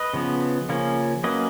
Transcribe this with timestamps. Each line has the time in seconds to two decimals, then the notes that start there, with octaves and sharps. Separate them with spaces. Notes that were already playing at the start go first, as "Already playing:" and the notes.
Already playing: B4 D#5
0.14 C#3 F3 B3
0.69 C#3 F3 A#3 C#4
1.24 F#3 A#3 C#4 B4 D#5